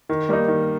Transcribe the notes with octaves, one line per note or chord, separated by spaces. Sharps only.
D#3
G3 A#3 D#4
D#3